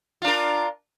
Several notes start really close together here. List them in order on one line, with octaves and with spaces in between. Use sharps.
F4 D4 A#4